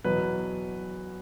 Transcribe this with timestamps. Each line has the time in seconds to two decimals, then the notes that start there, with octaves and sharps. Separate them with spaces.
0.04 E2 B2 F#3 B4